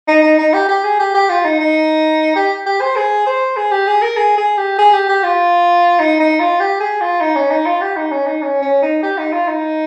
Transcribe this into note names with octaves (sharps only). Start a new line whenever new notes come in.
D#4
D#4
D#4
G4
G4
G#4
G4
G4
F4
D#4
D#4
G4
G4
C5
G#4
C5
G#4
G4
G#4
A#4
G#4
G#4
G4
G#4
G4
G4
F4
D#4
D#4
F4
G4
G#4
F4
D#4
C#4
D#4
F4
G4
D#4
C#4
D#4
C#4
C#4
D#4
G4
D#4
F4
D#4